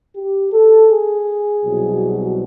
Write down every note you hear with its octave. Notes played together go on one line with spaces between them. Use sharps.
G4
A4
G#4
C2 B2 F#3